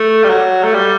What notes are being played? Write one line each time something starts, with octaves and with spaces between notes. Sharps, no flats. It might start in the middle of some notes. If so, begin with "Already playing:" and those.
Already playing: A3
G3
F#3
A3
G3